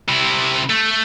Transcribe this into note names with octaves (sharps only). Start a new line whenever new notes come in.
C3 E4
A3